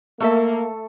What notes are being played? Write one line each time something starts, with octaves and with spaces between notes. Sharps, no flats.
A3 A#3 A4 E5